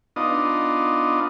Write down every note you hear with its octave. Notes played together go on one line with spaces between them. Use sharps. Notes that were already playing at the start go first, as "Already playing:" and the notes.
B3 D4 D#4 F4 D#5